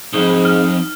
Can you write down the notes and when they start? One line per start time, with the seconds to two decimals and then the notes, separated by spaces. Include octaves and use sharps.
0.13 C2 F2 G#2 D#4
0.45 F6